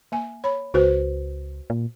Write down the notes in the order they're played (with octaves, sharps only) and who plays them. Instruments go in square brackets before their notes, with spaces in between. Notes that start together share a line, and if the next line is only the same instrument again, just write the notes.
[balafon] A#3 G#5
C#5 B5
[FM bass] C#2 [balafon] F#4 B4 C5
[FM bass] A#2